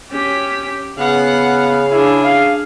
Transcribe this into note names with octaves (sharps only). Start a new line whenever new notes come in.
C#4 G4 B6
C#3 B3 F5 F#5
D4 E4 G#4
F5